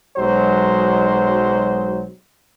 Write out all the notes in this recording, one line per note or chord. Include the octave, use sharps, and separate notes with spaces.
B1 F#3 G#3 C5